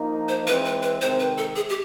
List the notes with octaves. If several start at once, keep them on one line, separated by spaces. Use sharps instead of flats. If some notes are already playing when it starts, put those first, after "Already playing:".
Already playing: F3 A#3 D#4
C5
E3 G#3 C4 B4
B4
B4
C3 D#3 G#3 C4 C5
B4
A4
G#4
G4